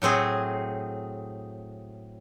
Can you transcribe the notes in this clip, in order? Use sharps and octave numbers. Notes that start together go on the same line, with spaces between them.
A2 F#3 C4 G#4